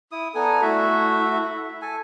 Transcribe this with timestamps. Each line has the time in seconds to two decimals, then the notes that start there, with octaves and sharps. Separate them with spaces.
0.12 E4 D#6
0.35 B3 A4 D5 G#5 A#5
0.62 A3 E4 F#4 E5
1.82 A4 G#5